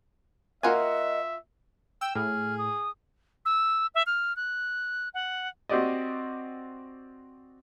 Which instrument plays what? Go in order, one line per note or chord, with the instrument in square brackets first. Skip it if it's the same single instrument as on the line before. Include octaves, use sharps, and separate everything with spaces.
[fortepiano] A#3 F#4 [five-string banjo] F4 G#5 [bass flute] D#5 [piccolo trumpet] E5
[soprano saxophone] G5 [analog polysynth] E6
[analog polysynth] A2 [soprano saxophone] G#4 [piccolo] F6
[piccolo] D#6
E6
E5
F6
F#6
F#5
[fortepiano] C4 F#4 G4 D5 D#5